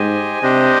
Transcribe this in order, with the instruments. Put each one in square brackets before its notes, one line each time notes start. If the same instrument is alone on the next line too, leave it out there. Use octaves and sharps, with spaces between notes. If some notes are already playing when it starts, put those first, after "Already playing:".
Already playing: [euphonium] G#2 [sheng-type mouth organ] G4 C5 D#5 G#5
[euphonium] C3 [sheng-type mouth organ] D4 G4 C5 D#5